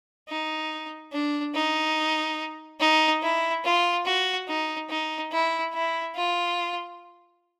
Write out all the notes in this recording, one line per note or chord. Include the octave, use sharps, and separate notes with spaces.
D#4
D4
D#4
D#4
E4
F4
F#4
D#4
D#4
E4
E4
F4